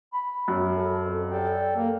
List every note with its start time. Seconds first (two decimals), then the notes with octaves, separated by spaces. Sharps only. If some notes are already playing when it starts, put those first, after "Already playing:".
0.13 B5
0.48 F#2
0.76 A4
1.04 F2
1.32 G3 A4 G5
1.76 A#3